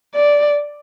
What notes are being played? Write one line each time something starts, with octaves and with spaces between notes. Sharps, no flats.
D5